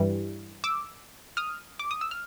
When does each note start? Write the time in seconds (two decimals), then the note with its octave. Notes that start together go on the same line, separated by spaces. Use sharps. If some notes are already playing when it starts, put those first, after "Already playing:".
Already playing: G2 E3 G3
0.64 D6 E6
1.37 D#6 F6
1.79 D6
1.91 D#6
2.01 E6
2.11 F6